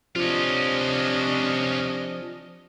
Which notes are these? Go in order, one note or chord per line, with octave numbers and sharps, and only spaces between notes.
C3 F3 C#4 D4 F4 D#5